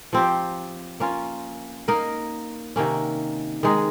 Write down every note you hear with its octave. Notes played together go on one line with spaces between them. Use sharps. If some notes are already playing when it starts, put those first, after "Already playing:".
F3 C4 G4
A#3 C#4 F4
A#3 D#4 A#4 D#5
C3 D#3 A#3 C#4
D#3 G#3 D#4 G#4